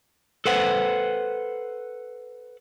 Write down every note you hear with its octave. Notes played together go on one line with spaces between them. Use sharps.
A4 B4 C5 F#5